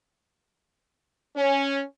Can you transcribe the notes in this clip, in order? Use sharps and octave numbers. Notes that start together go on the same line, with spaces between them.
C#4